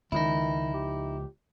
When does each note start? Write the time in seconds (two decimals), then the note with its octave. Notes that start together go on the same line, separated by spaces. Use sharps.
0.12 C#2 D#3 F3 D#4 E4
0.74 G4